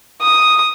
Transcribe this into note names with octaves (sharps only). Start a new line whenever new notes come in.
D#6